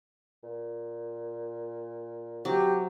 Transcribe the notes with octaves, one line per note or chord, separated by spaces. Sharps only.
A#2
C3 F#3 G4